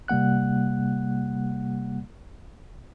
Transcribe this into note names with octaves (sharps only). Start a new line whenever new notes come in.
C3 G3 A#3 F#5 F#6